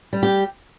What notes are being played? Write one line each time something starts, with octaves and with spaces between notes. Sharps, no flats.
G3
G4